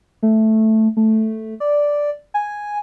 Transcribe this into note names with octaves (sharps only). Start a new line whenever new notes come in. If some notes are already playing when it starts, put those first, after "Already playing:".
A3
A3
D5
G#5